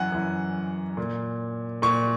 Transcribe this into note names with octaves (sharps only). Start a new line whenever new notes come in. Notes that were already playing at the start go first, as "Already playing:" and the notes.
Already playing: F#2 E3 F#5 G#5
F#2 E3
A#2
A#2 C#6